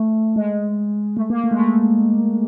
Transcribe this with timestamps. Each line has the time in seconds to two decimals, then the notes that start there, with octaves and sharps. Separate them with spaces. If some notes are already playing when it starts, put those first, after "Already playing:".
Already playing: A3
0.36 G#3
1.17 A3
1.30 A#3
1.44 A3
1.51 G#3
1.59 A3